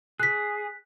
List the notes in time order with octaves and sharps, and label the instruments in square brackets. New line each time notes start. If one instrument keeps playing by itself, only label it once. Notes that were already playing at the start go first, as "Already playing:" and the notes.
[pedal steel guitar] G#4 [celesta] F#6 B6